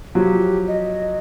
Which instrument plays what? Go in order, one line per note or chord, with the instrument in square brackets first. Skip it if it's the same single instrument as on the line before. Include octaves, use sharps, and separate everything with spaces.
[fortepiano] F3 F#3 [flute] G4
[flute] D#5